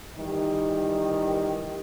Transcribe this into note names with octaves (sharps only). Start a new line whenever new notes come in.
D#3 E3 G3 D#4 G4